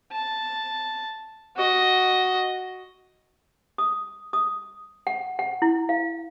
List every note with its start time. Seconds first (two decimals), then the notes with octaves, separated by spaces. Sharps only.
0.12 A5
1.56 F#4 D#5
3.78 D#6
4.33 D#6
5.07 F#5
5.39 F#5
5.62 E4
5.89 F5